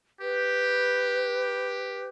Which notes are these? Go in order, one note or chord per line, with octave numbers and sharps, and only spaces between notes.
G4 B4